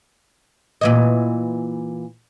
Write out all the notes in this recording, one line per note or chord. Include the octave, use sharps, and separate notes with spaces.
A#2 E3 D#5